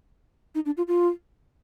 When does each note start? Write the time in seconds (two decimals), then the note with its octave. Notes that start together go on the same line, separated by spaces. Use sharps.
0.55 D#4
0.66 D4
0.77 F4
0.88 F4